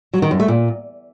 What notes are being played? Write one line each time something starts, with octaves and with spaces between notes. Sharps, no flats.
F#3
D#3
F#2
A3
A#2